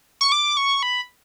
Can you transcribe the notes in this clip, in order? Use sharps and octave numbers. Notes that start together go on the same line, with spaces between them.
C#6
D6
C#6
B5